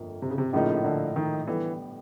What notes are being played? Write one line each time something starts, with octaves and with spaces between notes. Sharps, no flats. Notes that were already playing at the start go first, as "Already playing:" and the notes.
Already playing: G1 F2 D3 F3 A#3
C3
C#3
C3
A#1 A2 C#3 F3 A#3 D#4
D3
D#3
D3 E3 G3 B3